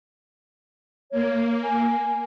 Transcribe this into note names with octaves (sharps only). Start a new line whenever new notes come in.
A#3 C#5
G#5